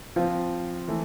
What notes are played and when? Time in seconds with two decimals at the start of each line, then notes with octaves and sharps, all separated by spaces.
0.16 F3 C4 F4
0.88 E3 A3